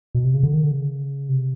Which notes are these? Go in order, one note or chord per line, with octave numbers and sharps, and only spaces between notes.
B2
C3
C#3
D3
D#3
D3
C#3
C3